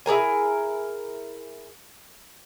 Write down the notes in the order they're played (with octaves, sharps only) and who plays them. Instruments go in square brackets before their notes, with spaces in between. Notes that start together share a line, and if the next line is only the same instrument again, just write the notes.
[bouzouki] E4 G#4 A#4 G#5